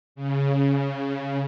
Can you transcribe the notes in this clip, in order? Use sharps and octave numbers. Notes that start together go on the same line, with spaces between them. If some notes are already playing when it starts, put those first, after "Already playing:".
C#3